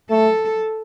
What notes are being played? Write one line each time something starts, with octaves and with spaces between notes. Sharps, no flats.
A3 A4